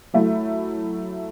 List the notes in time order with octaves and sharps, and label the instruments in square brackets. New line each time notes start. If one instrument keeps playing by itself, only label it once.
[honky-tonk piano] F#3 A3 E4